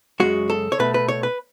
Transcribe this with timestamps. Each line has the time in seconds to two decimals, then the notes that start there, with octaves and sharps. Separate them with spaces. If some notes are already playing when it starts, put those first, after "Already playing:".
0.20 F#2 C#3 G#3 F#4
0.50 A4
0.72 C#5
0.79 B2 A3 B4
0.94 B4
1.08 C#5
1.23 B4